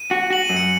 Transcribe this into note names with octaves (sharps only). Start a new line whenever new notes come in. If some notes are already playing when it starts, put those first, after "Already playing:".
Already playing: D#7
F#4
F#4 F#7
F#2 D#7
C#7